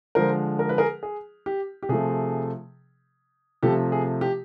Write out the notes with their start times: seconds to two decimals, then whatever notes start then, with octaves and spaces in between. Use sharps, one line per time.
0.15 D3 F3 G#3 A#4 C5
0.59 A#4
0.69 B4
0.78 G#4 A#4
1.03 G#4
1.46 G4
1.83 G4
1.89 C3 F3 A3 G#4
3.63 C3 F3 A3 G4 A4
3.92 G#4
4.21 G4